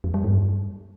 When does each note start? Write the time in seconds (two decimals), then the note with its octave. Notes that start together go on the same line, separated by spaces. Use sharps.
0.04 F2
0.14 G3
0.24 G2